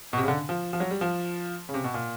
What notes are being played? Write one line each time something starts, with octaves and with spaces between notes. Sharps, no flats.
B2
C3
C#3
D3
F3
F3
F#3
G3
F3
C#3
C3
B2
A#2